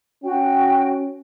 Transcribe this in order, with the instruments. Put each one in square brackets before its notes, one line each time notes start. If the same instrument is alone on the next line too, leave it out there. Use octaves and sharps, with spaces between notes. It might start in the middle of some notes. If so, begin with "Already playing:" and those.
[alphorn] C#4 [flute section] F#4 G5